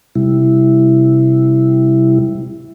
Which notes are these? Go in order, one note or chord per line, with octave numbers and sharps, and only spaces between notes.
C3 G3 E4